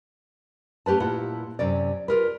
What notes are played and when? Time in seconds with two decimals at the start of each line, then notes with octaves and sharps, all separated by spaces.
0.86 A3 C#4 G4 B4 A5
1.00 A#2 E4 F4 F#5
1.59 F#2 C3 C#4 D5
2.08 F4 G#4 A#4 B4